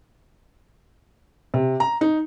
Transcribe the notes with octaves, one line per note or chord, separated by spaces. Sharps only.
C3
A#5
D#4